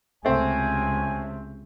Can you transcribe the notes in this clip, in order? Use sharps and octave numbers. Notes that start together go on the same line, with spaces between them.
C#2 C3 A3 C4 G#5